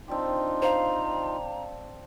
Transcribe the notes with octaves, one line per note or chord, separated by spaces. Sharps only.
C4 D4 D#4 F4 G4
C5 F5 A#5